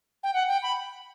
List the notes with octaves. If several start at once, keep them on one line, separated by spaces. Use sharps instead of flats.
G5
F#5
G5
B5